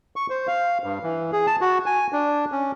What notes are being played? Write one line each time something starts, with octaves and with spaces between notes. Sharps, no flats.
C#6
C5
F5
G2
E3
G#4
A5
F#4
G#5
D4
C#4